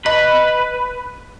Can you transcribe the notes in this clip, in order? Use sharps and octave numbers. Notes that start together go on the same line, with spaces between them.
B4 D#5